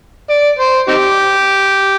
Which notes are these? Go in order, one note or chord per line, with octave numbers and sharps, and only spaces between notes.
D5
C5
C4 D#4 G4